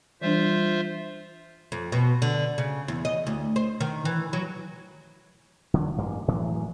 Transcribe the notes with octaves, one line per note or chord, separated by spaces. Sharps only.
E3 G3 D4 F4 C5 E5
F2
B2
D3
C#3
E2
D#5
D2
C5
D#3
E3
F#3
D3 F#3
A1 G2 A#3
A2 E3 F#3 G#3